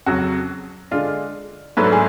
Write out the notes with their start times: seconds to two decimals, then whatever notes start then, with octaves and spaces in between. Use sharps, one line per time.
0.06 F2 C#3 F#3 F#4
0.91 D3 G#3 D4 F4
1.77 G#2 F#3 A3 D4 B4
1.84 A4
1.92 G#4